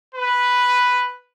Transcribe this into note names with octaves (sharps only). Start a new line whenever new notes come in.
B4